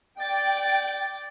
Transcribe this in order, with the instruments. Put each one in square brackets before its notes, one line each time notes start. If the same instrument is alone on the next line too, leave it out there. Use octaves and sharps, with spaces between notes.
[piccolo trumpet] D5 [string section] G5 [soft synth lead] A6